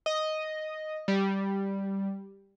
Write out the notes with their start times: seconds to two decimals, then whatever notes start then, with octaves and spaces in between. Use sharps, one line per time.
0.06 D#5
1.08 G3